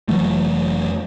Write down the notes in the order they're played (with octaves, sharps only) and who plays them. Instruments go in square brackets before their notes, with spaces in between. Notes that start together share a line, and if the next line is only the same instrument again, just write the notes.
[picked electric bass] F1 E3 F#3 A3